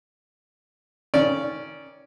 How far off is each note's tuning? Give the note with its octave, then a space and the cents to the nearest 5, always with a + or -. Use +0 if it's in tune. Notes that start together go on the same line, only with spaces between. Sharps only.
D#3 +25 C#4 +0 D5 -10